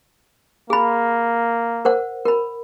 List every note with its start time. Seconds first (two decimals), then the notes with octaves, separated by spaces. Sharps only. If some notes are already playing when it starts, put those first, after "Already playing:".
0.70 A#3 G#4 B5
1.85 A#4 C5 F#5
2.25 A#4 B5